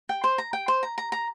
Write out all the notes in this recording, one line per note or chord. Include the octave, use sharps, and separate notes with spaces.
G5
C5
A#5
G5
C5
A#5
A#5
A#5